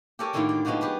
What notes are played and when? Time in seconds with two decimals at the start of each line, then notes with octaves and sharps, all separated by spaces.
0.19 G4 A4 A#4 C#5 D5 G#5
0.33 A2 D3 D#3 A#3 D#4 F4
0.49 D5
0.65 F3 G#3 B3 D#4 F#4 G4
0.81 G4 G#4 B4